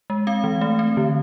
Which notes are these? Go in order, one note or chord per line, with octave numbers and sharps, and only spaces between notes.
G#3
C4 F5
E3
A3
C4
D3